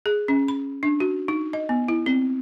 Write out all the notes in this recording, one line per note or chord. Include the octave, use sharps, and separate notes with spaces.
G#4
C#4
B5
D4
F#4
D#4
D#5
B3
E4
C4